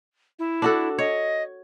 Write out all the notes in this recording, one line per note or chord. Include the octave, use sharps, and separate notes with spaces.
E4
D4 F#4 A4
C#5 D#5